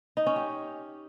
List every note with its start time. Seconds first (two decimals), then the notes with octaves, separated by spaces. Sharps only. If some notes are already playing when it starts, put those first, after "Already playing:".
0.17 D#4
0.26 C#4
0.36 G4